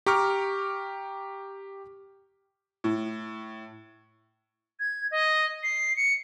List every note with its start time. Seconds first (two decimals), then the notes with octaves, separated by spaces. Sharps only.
0.06 G4 A#5 C#6 D6 F6
2.84 A2
4.80 G#6
5.11 D#5
5.63 C7
5.97 C#7